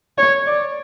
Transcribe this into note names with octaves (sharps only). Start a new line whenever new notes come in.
C#5
D5